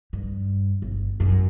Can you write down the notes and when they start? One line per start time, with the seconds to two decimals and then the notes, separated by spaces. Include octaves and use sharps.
0.13 G2
0.82 G1
1.20 F#2